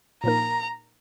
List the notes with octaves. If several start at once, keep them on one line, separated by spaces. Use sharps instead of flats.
A#2 F3 A#3 D#4 A#4 A#5